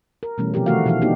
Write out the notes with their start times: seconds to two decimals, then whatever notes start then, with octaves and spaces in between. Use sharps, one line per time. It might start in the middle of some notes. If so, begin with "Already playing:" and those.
0.23 A#4
0.38 B2 E3 G3 A3 C#4
0.54 C3 F3 C4 G4 A#4
0.66 D#3 E3 A3 F#4 A#4 F5
0.86 B2 E3 F3 F#4 F5
1.02 A#3 B3 D4 D#4 F#4 G4